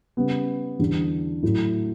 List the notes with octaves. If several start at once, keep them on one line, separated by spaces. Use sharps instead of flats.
C#3 G3 B3
E2 D3 G3 D4
A2 F#3 A3 E4